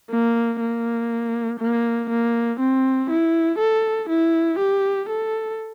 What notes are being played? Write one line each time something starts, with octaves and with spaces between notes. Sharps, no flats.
A#3
A#3
A#3
A#3
C4
E4
A4
E4
G4
A4